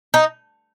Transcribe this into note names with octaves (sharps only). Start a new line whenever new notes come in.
D#4